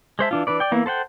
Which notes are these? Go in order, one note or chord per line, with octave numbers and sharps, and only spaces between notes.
G#3 C5 E5 A5
E3 D4 F4
E3 D4 B4 D5
D5 G5
E3 A#3 B3 E4
A4 C5 F#5 G5